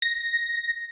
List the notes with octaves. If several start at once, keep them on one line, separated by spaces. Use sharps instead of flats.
A#6